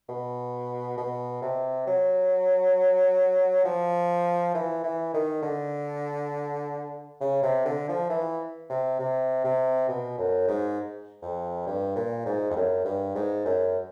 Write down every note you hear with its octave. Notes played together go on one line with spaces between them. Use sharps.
B2
B2
C3
F#3
F3
E3
E3
D#3
D3
C#3
C3
D3
F3
E3
C3
C3
C3
B2
F#2
G#2
F2
G2
A#2
G#2
F2
F#2
G2
G#2
F#2